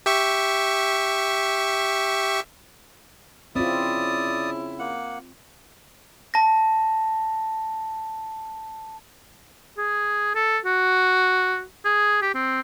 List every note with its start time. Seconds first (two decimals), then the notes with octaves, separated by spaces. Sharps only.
0.06 G4 E5 C#6
3.56 C#3 C4 E4 F4 D5 D#6
4.79 A#3 F#5
6.34 A5 A#6
9.77 G#4
10.35 A4
10.65 F#4
11.85 G#4
12.22 G4
12.34 C4